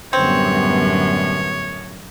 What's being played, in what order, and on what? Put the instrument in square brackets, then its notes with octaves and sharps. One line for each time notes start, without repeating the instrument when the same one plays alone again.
[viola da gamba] F#2 A2 [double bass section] D3 G3 B3 [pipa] C4 [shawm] C#5